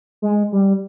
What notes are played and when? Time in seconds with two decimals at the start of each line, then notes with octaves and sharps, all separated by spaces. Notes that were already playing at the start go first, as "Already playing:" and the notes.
0.22 G#3
0.52 G3